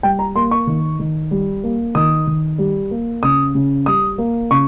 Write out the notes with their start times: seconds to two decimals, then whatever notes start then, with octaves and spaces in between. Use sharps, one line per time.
0.03 G3 G5
0.19 A#5
0.36 A#3 C6
0.51 C#6
0.67 D#3
0.99 D#3
1.31 G3
1.64 A#3
1.95 D#3 D#6
2.27 D#3
2.58 G3
2.91 A#3
3.23 C#3 D#6
3.55 C#3
3.86 G3 D#6
4.18 A#3
4.51 C#3 C#6